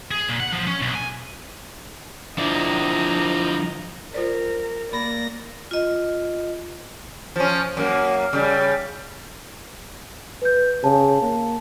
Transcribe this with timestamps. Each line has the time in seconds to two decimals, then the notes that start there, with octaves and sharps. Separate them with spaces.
0.11 G#4
0.28 A#2
0.40 F#5
0.52 F3
0.67 C#4
0.82 B1
0.95 G#5
2.38 D3 F3 E4 D5 D#5 A#5
4.14 F4 A#4 C5 D5
4.93 A#3 D5 B5 A#6
5.71 F4 D#5
7.36 F3 C#4
7.77 F#2 A#3
8.33 C#3 G3
10.42 B4 G6
10.84 C#3 A5
11.22 A#3